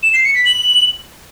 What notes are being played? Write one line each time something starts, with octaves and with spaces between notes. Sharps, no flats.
E7
C7
C#7
B6
F#7